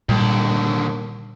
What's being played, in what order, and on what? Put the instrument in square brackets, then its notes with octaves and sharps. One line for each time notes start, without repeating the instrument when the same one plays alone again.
[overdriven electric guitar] D#2 D3 [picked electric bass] A#2 G3